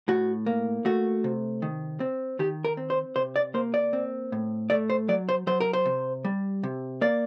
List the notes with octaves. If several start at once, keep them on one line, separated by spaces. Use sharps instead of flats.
A2 F#4
A#3
A3 F#4
C3
D#3
C4
D#3 G4
A#4
C4
C5
C3 C5
D5
A#3 C5
D5
C4
A2
A3 D5
C5
F#3 D5
C5
F#3 C5
A#4
C5
C3
G3
C3
A#3 D5